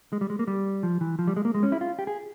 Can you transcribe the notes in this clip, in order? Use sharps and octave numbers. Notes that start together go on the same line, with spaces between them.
G#3
G3
G#3
A#3
G3
F3
E3
F3
G3
G#3
A#3
G#3
C#4
E4
F4
G4
G#4